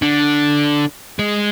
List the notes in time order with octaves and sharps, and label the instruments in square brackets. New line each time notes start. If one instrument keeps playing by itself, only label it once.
[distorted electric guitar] D3
G#3